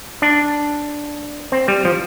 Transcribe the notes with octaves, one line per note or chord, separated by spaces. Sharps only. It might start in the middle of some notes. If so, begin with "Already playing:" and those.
D4
C4
G3
F3